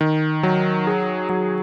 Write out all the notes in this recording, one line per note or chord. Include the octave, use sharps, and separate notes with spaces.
D#3
F#3
G#4
F#3